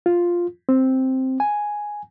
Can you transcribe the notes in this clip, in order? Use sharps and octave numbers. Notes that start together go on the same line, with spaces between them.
F4
C4
G#5